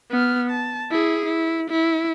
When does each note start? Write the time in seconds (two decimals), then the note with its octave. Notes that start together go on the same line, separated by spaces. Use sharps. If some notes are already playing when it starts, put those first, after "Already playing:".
0.11 B3 F6
0.50 A5
0.91 E4 G#4
1.26 E4
1.70 E4